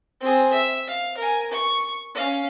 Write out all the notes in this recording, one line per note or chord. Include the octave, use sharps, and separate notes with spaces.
C4 G#4
E5
F5
A#4 G#5
C#6
C#4 F5